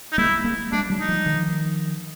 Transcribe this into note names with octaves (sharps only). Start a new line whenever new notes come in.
D#4
G#3 A#3 E4
G#3 A#3
G3 A3 D4
F#3 G#3
D#4
F3 G3
D#3 F3